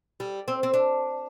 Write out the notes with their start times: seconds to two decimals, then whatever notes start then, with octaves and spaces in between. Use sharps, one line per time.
0.20 G3
0.48 C4
0.63 C4
0.74 D4